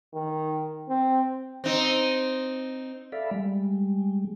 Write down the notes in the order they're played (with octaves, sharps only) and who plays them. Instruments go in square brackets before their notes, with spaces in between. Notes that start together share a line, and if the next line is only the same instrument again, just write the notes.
[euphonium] D#3
C4
[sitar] C4 D#4
[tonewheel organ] A4 D5 E5 F5 B5
G3 G#3